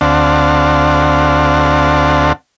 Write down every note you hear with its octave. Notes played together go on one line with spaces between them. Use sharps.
D2 C4 D4 F5 F#5 A5